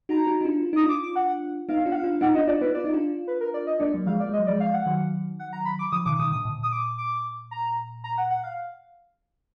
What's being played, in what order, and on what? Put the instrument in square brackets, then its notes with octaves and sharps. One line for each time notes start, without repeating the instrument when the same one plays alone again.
[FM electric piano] D#4 F#4 [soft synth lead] A#5
[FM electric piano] D#4 F#4
D#4
D4 F4
F4
[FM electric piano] D#4 [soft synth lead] D#6
[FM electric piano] D4 F4
[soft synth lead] D6
D6
F#5
[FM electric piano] B3 D#4 [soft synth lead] F5
[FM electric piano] D4 F4
[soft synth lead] F#5
F5
[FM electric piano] D4 F4
[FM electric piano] B3 D#4 [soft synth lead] F#5
[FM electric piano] D4 F4 [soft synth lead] D#5
[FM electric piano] D4 F4 [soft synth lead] D5
[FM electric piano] B3 D#4 [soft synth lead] B4
[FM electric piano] F4 [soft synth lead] D5
[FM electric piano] D#4
D4 F4
[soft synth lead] B4
A#4
D5
D#5
[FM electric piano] A#3 D4 [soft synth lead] D5
[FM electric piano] F#3 A#3
[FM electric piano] F3 G#3 [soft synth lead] F5
[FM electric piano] A#3 [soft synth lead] D5
[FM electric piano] G#3 [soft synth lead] D#5
[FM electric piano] F#3
[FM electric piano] F3 G#3 [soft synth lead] D5
[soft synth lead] F5
F#5
[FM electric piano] D#3 F#3
[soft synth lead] F#5
A#5
B5
D6
[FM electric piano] D3 F3 [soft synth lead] D#6
[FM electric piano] B2 D#3 [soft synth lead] D6
[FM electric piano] B2 D#3 [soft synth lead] D#6
[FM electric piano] A#2 D3 [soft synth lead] D#6
[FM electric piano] A#2
[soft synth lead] D#6
D6
D6
A#5
A#5
F#5
F#5
F5